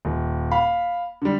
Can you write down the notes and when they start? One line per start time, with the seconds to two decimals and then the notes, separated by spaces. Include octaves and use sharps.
0.05 D#1
0.51 F5 B5
1.22 D3 G3